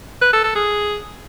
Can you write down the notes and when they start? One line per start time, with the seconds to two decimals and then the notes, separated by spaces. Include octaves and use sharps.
0.22 B4
0.33 A4
0.44 A4
0.55 G#4